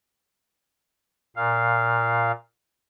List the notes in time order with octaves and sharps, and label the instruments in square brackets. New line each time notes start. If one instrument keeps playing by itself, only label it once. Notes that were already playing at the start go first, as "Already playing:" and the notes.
[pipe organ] A#2 F5